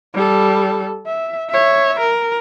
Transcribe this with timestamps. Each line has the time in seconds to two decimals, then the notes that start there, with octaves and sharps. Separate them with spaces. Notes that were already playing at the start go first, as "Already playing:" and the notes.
0.14 G3 A4
1.06 E5
1.50 C#5 E5
1.99 A#4